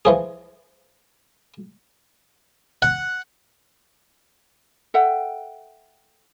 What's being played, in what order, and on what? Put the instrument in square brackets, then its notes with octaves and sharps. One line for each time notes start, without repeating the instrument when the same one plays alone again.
[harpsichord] E3 F3 G#4
F#5
[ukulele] A4 E5 F#5 G5